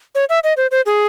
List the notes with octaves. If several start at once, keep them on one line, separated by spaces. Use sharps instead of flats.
C#5
E5
D#5
C5
C5
G#4